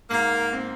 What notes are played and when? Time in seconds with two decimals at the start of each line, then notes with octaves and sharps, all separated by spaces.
0.10 G#2 A#3
0.53 C4